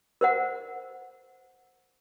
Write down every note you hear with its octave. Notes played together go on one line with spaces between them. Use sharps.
A#4 C5 F#5